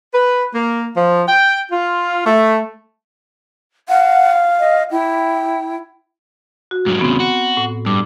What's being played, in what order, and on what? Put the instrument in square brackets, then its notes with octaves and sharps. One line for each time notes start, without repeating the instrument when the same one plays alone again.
[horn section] B4
A#3
F3
G5
F4
A3
[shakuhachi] F5 [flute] F#5
[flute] D#5
[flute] E4 [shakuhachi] G5
[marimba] F#4
[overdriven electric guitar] G#2 F#3
[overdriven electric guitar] E2 C#3 [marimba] B3 C4
[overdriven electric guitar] F#4
[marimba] A2
[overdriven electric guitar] G2 [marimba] D6